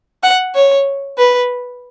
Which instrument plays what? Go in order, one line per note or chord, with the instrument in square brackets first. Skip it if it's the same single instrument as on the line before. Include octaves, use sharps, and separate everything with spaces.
[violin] F#5
C#5
B4